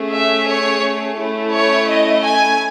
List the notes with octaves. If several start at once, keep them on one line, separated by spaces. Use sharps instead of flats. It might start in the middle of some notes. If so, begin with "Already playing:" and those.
Already playing: A3 C#4 G#4
E5
C#5
A3 C#4 E4
C#5
D#5
G#5